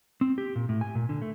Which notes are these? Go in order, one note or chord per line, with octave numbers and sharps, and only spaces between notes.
C4
G4
A#2
A2
G#5
A#2
D3
A3